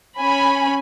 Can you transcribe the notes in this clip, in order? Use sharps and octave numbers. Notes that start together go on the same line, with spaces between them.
C#4 G#5 B5